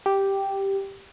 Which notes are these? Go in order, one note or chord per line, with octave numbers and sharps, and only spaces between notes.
G4